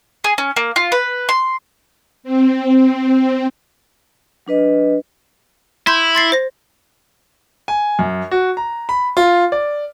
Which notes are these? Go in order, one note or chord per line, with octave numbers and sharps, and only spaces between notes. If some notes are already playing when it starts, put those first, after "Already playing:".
G#4
C#4
A#3
F4
B4
C6
C4
F#3 D4 B4 D#5
E4 C6 G6
C6 A6 C7
C5 A#6
G#5
F#2
F#4
A#5
B5
F4
D5